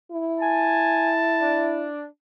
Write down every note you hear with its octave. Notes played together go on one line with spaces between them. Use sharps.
E4
G#5 A5
D4